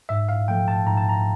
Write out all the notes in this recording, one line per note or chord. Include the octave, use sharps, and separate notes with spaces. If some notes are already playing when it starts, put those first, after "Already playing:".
G#2 E5
F5
F3 A3 G5
A5
G#2 A#5
A5
A#5